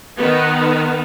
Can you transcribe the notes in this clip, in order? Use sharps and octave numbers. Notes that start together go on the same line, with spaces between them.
D#3 B3